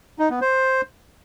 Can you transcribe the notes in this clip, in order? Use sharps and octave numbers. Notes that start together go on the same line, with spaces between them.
D#4
B3
C5